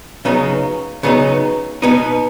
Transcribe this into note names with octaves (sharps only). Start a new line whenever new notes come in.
C#3 F#3 B3 D#4
C#3 F#3 B3 D#4
B2 B3 D#4